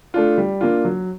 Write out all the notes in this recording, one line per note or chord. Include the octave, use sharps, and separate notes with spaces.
A3 D4 F4
G3
A#3 D4 F4
F#3